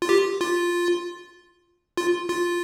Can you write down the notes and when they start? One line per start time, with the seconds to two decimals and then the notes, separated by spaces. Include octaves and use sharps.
0.02 F4
0.09 G4
0.41 F4
1.97 F4
2.29 F4